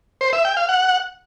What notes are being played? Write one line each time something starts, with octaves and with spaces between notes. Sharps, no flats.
C5
E5
G5
F5
F#5